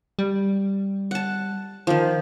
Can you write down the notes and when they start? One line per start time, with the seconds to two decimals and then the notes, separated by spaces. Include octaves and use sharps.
0.19 G3
1.11 F#5 A5
1.87 D#3 F3